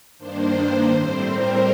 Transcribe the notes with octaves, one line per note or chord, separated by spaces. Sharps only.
G2 D#3 A#3 D4 C5
A2 G3 C4 C5
A#4